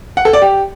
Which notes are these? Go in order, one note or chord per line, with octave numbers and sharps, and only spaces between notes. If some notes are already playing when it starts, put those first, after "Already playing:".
F#5
A4
D5
G4